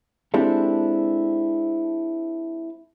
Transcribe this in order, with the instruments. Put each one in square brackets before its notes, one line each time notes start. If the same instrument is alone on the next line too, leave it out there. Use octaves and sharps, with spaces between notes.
[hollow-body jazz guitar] G#3 C4 D4 E4 G4 A4